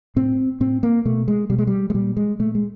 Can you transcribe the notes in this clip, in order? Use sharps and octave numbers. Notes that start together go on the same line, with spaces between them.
A2 C4
A2 C4
A#3
B2 A3
G#3
B2 G3
G#3
G3
G#3
A#2 G3
G#3
A#2 A3
G#3